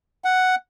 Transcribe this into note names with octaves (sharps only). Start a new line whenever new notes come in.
F#5